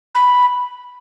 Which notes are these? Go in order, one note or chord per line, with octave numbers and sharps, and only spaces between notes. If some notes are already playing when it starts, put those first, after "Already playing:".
B5